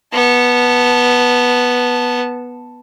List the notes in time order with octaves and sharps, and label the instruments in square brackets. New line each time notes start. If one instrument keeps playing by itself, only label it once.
[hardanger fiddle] B3 A5